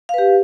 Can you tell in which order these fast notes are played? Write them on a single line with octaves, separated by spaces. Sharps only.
F5 B4 G4